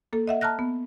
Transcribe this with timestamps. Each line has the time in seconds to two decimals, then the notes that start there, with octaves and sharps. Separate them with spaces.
0.13 A#3 A4
0.27 D#5 E5 F#5
0.41 A5 A#5 F6 F#6 A#6
0.59 B3